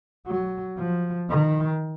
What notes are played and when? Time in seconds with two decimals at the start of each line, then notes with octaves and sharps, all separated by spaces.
0.27 F#3
0.77 F3
1.29 D#3